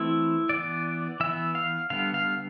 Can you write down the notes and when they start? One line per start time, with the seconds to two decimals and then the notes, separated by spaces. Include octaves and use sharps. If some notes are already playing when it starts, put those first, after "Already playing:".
Already playing: E3 A3 C4 E4
0.49 E3 B3 D5
1.20 E3 B3 E5
1.55 F5
1.90 D3 G3 B3 F5
2.14 F5